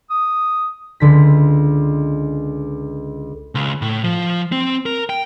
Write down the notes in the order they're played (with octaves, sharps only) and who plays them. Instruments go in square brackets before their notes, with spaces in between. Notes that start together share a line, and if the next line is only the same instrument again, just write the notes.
[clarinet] D#6
[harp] C#2 D3 B6
[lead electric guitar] C#2
A2
F3
C4
A#4
G5